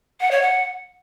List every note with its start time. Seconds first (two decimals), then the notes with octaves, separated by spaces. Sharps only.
0.20 F#5
0.31 C#5
0.42 F#5